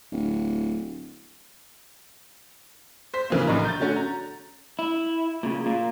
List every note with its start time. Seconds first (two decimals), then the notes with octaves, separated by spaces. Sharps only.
0.12 D1
3.14 C5 B6
3.30 C#3 E3 A#3
3.47 A#1 A2 D#4 A#5
3.65 G6 A6
3.79 D3 A3 C#4 F#4
3.96 A#5
4.79 E4
5.43 A#2 C#3
5.66 A#2 A#3